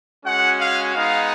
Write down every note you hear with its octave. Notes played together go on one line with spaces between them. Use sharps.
G#3 C#4 F#4 F#5
F5
G#3 B3 D#4 F5